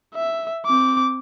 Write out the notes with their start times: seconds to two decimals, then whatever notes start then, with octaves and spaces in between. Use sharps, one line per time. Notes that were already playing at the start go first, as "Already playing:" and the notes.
0.15 E5
0.66 C4 D6